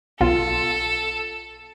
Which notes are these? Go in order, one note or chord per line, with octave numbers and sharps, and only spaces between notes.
B1 F4 A4